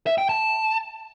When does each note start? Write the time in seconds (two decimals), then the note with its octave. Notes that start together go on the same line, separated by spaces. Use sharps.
0.06 E5
0.18 G5
0.29 A5